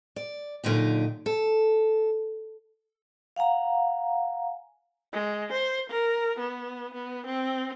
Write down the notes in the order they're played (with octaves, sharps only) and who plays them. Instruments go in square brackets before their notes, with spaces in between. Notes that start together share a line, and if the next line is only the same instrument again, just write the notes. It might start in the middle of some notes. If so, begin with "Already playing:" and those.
[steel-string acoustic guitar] D5
F#2 A#2 D3 D#4 G4
A4
[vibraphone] F5 F#5 G#5 A#5
[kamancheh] G#3
C5
A#4
B3
B3
C4